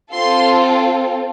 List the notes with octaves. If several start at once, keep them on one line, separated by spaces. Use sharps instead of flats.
C4 F4 A4 C6